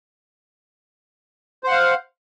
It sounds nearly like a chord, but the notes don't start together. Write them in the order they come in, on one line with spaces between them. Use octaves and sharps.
C5 F#5 F5